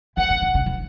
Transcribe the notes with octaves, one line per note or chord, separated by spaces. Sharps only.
E3 F#5
D3
D#3
C#3
E3